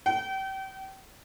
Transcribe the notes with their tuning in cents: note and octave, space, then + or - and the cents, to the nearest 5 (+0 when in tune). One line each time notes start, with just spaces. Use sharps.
G5 -35